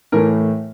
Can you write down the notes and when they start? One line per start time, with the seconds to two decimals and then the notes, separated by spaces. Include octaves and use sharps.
0.12 A2 E3 A3 A#4